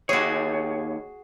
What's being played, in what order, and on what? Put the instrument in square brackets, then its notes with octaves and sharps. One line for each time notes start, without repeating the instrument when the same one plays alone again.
[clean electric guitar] D#2 C#5 [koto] F#4 G#4